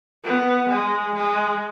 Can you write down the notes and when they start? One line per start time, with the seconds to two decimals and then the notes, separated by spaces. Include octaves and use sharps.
0.24 B3
0.69 G#3
1.15 G#3